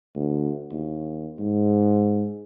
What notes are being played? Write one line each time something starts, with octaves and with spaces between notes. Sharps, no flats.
D2
D#2
G#2